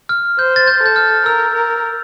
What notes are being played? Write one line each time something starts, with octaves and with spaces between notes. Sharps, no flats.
F6
C5 G6
A6
G6
A4 G6
F6
A#4 E6
A#4